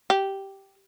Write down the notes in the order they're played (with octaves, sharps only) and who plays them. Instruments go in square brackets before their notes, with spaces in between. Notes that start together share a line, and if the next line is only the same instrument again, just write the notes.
[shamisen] G4